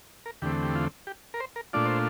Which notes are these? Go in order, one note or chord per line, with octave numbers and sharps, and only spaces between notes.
A#4
E2 D3 A3 C4 G4
G4
F4
G4
A#4
C5
A#4
A#2 A3 D4 F4 D5
C5